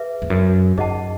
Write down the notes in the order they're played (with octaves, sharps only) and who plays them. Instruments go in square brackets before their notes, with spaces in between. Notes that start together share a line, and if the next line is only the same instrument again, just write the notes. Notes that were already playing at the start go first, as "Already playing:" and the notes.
Already playing: [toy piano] G#4 B4 E5
[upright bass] E2
F#2
[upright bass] F#2 [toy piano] D#4 G#4 D#5 F#5 A5